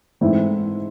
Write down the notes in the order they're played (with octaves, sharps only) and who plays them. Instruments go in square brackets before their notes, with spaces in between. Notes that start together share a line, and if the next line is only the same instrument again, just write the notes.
[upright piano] G#2 E3 A3 C4 E4